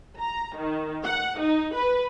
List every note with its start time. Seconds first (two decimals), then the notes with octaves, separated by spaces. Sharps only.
0.19 A#5
0.57 D#3
1.04 F#5
1.39 D#4
1.74 B4